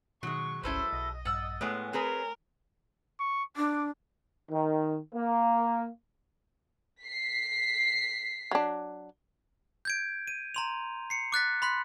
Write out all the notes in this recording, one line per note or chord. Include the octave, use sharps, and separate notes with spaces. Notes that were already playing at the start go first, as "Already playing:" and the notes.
B2 D#3 F#3 G#3 C#6
G1 C2 C#4 E4 A4 B4 C5
B1 D#5 A#6
A#1 G2 F#5 E6 A6
A2 G#3 A3 B3 C#5 G#5
C4 G#4 A#4 B4
C#6
D4 D6
D#3
A#3
B6 C7
F#3 D4
G6 G#6 D7
D#7
A#5 C6 F7
C7 C#7
D6 F#6 A6 B6
B5 C6 F#6 B6